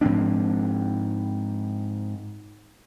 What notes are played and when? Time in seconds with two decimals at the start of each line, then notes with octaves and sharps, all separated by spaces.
0.01 G#2 F3 C4 D4